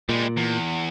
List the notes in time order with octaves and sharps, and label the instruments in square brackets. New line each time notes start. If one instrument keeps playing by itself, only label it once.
[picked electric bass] A#2 [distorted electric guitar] G3 G#3
[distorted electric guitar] E2